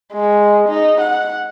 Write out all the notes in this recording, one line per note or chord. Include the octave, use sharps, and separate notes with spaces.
G#3
D#4
F#5